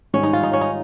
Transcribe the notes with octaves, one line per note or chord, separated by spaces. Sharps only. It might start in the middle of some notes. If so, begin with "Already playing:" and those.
G#2 D#3 G3 C#4
D#4
F4
D#4
C#4
D#4